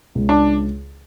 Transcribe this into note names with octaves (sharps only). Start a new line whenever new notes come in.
C#2
D4